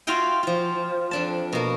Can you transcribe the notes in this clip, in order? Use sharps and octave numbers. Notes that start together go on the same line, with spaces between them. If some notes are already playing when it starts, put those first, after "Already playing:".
F4 F#4 E5 F5 G5 G#5
F3 F4
F2 D4 A5
B2 A#3